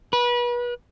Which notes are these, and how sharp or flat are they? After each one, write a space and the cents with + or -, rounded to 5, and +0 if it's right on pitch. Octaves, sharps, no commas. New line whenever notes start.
B4 -30